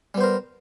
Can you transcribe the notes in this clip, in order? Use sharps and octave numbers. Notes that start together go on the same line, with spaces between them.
G3 B3 A#4 C5